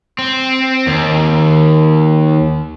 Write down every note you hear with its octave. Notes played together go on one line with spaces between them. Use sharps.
C4
D#2